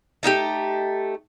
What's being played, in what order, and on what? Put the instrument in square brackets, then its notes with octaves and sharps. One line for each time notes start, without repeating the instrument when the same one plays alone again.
[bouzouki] A3 D#4 E4 G4